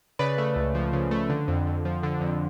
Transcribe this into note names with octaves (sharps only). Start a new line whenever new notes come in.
C#3 B4 D5
A3
C#2
F3
C#3
A3
D3
F2
F2
F3
D3
F2